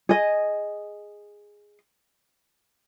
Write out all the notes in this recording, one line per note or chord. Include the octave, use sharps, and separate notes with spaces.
G#4 D#5